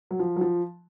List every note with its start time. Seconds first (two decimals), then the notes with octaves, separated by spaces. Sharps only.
0.11 F#3
0.19 F3
0.36 F#3
0.41 F3